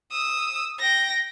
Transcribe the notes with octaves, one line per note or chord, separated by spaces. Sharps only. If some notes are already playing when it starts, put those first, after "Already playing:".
D#6 E6
G5 A#6